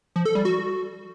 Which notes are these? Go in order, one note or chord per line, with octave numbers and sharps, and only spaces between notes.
F3
A4
G3
F#4